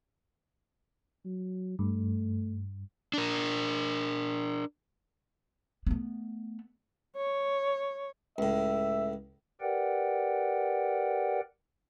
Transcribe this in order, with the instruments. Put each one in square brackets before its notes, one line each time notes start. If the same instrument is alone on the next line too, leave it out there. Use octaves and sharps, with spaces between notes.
[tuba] F#3
[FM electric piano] G2 [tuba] A3
[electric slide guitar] D4 A#4
[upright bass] A3 B3
[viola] C#5
[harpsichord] C#2 A2 [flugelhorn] E5
[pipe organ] G4 A#4 B4 D5 F#5 G5